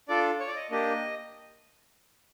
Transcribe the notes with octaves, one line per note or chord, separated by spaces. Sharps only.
D4 F4 A4 D5
C#5
D5
D#5
A#3 D4 G4 D#5